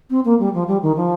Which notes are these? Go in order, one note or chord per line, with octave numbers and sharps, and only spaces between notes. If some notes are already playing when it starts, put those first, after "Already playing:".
C4
A#3
G3
F3
G3
D#3
F3